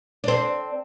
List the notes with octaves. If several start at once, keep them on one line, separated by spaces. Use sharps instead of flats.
C4 D4